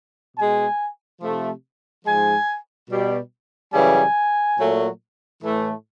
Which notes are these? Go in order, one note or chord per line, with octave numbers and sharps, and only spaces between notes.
B2 G#3 G#5
C3 F3 A3
G#2 F3 G#3 G#5
B2 G3
F#2 C#3 E3 G3 G#5
A#2 F#3 A3
A2 E3 A3